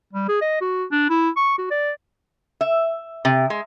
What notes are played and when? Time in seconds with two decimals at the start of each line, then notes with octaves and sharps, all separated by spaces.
0.13 G3
0.29 G#4
0.41 D#5
0.61 F#4
0.92 D4
1.10 E4
1.37 C#6
1.58 F#4
1.71 D5
2.61 E5
3.25 C3
3.50 G#3